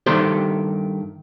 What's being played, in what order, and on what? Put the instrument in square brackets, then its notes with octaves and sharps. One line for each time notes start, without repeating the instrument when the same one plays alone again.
[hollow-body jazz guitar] G2 D#3 A3 G4 C5